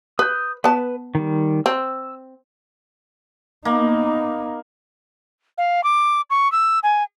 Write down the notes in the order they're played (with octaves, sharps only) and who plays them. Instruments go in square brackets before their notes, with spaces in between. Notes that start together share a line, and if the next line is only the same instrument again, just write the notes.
[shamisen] B4 [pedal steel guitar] D#6 G6
[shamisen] B3 A5 [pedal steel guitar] B4
[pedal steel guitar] D#3 G3
[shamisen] C4 [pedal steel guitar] E6
[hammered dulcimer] A#3 [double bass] B3 D#4
[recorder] F5
D6
C#6
E6
G#5